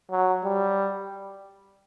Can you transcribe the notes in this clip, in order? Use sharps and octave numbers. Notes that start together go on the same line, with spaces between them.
F#3
G3